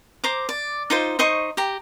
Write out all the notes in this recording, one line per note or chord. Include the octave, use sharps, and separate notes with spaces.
C5 A#5 D6
D5
D#4 F4 C5
D#4 C5 D#5 C#6
G4 A#5